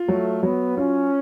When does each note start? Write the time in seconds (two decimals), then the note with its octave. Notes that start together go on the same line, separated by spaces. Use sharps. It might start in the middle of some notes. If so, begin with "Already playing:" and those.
Already playing: F4
0.08 F#3 A3
0.43 F#3 B3
0.77 C#4 F4